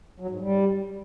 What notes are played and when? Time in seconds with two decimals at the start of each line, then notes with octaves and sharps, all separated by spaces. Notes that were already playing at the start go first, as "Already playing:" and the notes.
0.20 F#3
0.30 G#2
0.41 G3